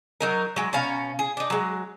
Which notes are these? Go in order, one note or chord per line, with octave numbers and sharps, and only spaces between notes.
F#3 D#4 A#4
F#3 G#3
B2 C#4 F5 A#5
G#4
D4 D#4
F#3 G#3